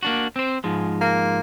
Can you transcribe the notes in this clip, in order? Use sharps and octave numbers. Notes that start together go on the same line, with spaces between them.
A#3 D4 F#4
C4 C5
G#2 F3 G#3
A#3